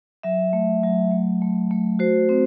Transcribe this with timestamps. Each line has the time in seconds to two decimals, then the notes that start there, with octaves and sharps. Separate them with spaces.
0.23 F#3 E5
0.53 A3
0.83 F#3
1.11 A3
1.42 A3
1.71 A3
1.99 F#4 C5
2.29 C4